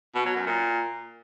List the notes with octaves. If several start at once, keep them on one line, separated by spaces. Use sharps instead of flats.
B2
F#3
F#2
A#2